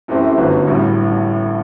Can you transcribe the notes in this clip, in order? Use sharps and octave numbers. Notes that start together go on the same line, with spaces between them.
F#2 E3 A3 C4 G4
G1 F#2 D3 F#3 B3
A1 A2 E3 G3